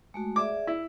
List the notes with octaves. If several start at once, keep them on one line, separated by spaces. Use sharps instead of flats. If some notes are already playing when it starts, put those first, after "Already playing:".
G#3 A3 F#4
G#4 D5 E5 D6
E4